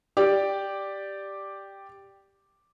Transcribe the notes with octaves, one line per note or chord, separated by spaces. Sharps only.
G4 D5